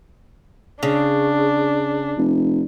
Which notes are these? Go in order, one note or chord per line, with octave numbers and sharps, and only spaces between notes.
C#3 D4
F1